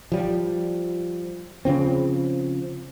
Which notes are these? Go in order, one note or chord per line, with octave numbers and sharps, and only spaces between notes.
F3 G3
C#3 F3 C4